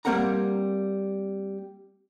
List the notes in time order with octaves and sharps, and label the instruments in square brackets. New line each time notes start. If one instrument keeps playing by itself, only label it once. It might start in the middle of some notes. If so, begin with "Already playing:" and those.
[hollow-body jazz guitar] G3 A#3 C4 A#4 F#5 A#5